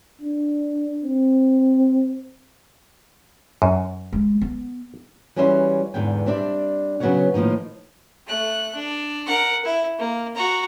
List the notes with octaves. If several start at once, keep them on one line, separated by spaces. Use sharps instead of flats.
D4
C4
F#2
G#3
B3
E3 G3 C#4 F#4 C5 E5
E2 G#2 D3 B3 G5
G3 C4 D4 D5 E5
C#3 F#3 B3 F#4 C#5 F#5
A2 D#3 F3 A#3 D#4
A3 F#6
D4
A#4 F#5
E4
A#3
F#4 A#5